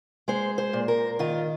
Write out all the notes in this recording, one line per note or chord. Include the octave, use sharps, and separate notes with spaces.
G#3 C5
C5
A#2
A#4
D#3 F4